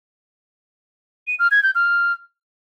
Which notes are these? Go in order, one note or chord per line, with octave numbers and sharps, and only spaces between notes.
D#7
F6
G#6
G6
F6